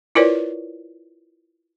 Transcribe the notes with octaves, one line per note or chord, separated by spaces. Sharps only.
E4 F4 A#4 B4 C#5 D5